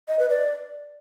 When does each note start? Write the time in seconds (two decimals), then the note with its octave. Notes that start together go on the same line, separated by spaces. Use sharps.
0.08 D#5
0.19 B4
0.30 D5